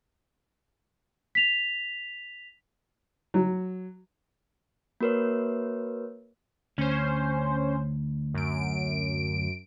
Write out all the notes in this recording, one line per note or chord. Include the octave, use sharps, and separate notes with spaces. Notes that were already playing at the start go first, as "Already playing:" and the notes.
B6 F7
F#3
A#3 F#4 A#4 B4 C#5
D2 C#4 C5
F#2 D7